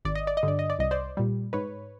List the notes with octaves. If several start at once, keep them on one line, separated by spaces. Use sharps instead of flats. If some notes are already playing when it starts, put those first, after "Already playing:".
G#1 D5
D#5
D5
D#5
G2 D3
D5
D#5
D5
C2 D#5
C5 D5
A#2 G3
G#2 B4 C#5